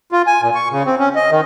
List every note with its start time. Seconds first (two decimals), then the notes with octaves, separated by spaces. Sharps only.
0.12 F4
0.27 G#5
0.41 A#2
0.55 C#6
0.71 C#3
0.86 C4
0.99 C#4
1.15 D#5
1.31 D#3